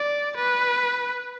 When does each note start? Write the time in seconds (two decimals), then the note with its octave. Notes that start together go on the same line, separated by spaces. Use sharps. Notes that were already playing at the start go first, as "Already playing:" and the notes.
Already playing: D5
0.36 B4